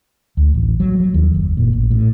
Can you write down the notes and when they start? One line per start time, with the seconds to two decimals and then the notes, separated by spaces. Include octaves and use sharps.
0.37 D2
0.54 A1
0.80 F#3
1.00 F#3
1.14 D#2
1.34 F#1
1.57 A#2
1.73 A1
1.91 A2